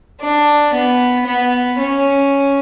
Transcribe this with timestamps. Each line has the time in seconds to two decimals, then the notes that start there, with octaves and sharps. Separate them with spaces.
0.21 D4
0.73 B3
1.27 B3
1.79 C#4